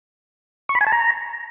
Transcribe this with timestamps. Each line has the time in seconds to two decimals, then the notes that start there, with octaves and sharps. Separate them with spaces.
0.69 C#6
0.75 B5
0.81 G#5
0.87 A5
0.92 A#5